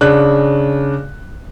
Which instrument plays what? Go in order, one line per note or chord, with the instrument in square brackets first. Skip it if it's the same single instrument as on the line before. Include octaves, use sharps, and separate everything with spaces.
[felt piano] C#3 D4 F#6